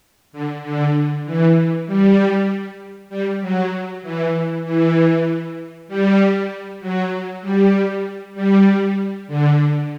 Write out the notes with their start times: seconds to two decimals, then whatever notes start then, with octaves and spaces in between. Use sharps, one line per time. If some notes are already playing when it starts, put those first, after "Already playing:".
0.33 D3
0.63 D3
1.25 E3
1.87 G3
3.10 G3
3.41 F#3
4.02 E3
4.64 E3
5.88 G3
6.80 F#3
7.42 G3
8.34 G3
9.28 D3